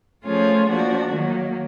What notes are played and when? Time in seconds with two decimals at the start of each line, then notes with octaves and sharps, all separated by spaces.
0.25 F3 A3 C#4 F4 G#4
0.69 F3 A#3 D4 F#4
1.11 D#3 F#3 A#3